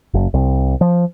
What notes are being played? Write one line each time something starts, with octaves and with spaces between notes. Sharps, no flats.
F#1
C2
F3